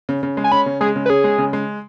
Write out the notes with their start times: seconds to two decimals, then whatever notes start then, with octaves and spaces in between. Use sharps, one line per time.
0.09 C#3
0.23 C#3
0.37 G#3
0.44 G#5
0.52 C#4 B5
0.66 C#3
0.81 G#3 G#4
0.96 C#3
1.06 B4
1.09 C#4 G#4
1.24 G#3
1.38 C#3
1.53 G#3